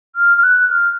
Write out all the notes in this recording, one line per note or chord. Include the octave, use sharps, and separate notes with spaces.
F6
F6
F#6
F6